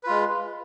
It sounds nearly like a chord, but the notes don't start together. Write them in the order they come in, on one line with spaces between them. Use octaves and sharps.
B4 F4 G#3